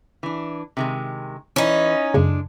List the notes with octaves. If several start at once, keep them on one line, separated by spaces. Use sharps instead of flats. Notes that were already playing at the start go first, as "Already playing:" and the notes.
E3 D4
C3 D#3 G#3
E3 C#4 D#4
F#2 C#3 G#3 D4